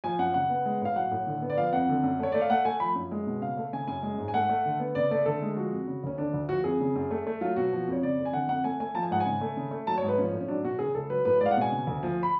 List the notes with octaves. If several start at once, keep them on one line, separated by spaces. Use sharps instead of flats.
F3 G#5
F#2 F#5
C#3 F#5
B3
G#3
A2 F5
F#3 F#5
A2
D3
B3
D5
F3 F5
F2 F#5
D3
F#2
A3 C#5
A3 D5
F5
A3 F#5
A3 G#5
F3 B5
F#2
G#3
B2
C#3 F5
A3
C#3 G#5
F#2 G#5
G#3
G#2
G#5
A3 F#5
A3
D3
B3
C#3 D5
A3 D5
D3 A4
G#3
F3 F#4
F2
C#3
D2 C#4
D3 D4
D2
F3 F#4
F2 G#4
C#3
F#2
A3
A3
F#3 F4
B2 F#4
F3
F2 C#5
C#3 D5
F2
G#5
D3 F#5
F2 F#5
A3 G#5
A3 G#5
F3 A5
G#5
G#2 F#5
G#5
C#3
A3
C#3
A3
F#3 A5
C#5
G#2
B4
F3 C#4
A2
C#4
F#3 D4
B2 F#4
C#3 G#4
C#2 A4
F#3 B4
A2 B4
G#3 D5
F5
F#5
B2 G#5
C#3
D2
F3
B5